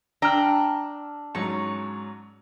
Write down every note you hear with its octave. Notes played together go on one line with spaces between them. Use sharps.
D4 G5 A#5 E6 F6
G#2 F#3 C#4 C#6